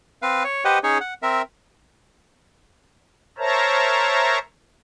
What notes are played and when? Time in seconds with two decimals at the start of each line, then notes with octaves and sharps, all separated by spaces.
0.22 C4 B4 F5
0.44 C#5
0.65 G4 B4 C5 D#5 F#5
0.83 C#4 D#4 G#4 C#5
1.01 F#5
1.22 C4 A#4 E5
3.38 A#4 C5 C#5 E5 A5 A#5